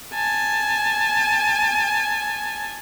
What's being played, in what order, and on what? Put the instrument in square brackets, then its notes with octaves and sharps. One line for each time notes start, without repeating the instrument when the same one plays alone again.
[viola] G#5 A5